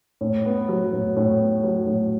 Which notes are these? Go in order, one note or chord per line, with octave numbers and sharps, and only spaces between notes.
A2
B3
F#3
A2
A2
B3
F#3
A2